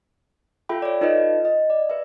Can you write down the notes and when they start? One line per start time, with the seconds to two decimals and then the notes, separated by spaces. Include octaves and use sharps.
0.69 F4 A4 E5 G5 B5
0.82 C#5 D5
1.01 D#4 F4 A4 B4 D#5
1.45 D#5
1.70 D5
1.90 B4 E5